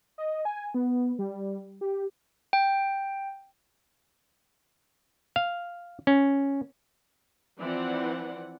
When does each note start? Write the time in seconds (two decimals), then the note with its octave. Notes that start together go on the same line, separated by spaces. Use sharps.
0.18 D#5
0.45 G#5
0.74 B3
1.19 G3
1.81 G4
2.53 G5
5.36 F5
6.07 C#4
7.58 E3 F3 C4 D5 F#5